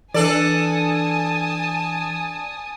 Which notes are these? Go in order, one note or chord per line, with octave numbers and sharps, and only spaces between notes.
E3 D4 A4 D5 G#5 A5 D#6